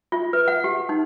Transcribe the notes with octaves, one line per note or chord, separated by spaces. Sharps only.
F4
B4
F#5
G4
D#4